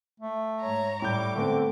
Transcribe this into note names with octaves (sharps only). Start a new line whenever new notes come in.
A3
G#2 C#5 A#5
A2 G3 D6 G6
D3 A3 B3 C4